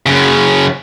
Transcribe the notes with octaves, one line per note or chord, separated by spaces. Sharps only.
F#2 C#3